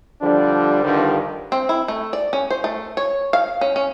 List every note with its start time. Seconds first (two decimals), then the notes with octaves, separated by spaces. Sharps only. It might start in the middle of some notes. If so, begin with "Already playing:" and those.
0.21 D3 F3 G3 D4
0.83 G2 D3 D#3 F3 G3
1.52 C4
1.69 E4
1.88 A3
2.13 D5
2.33 C#4
2.50 C5
2.64 A3
2.97 C#5
3.33 F5
3.61 C#4
3.76 C#4